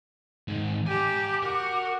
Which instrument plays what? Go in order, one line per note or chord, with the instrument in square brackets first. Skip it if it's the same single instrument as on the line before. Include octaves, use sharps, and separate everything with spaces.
[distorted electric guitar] G#2 D#3
[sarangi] G4 [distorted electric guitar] G#5 A#5 [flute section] D6
[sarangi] F#4 [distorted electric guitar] A#4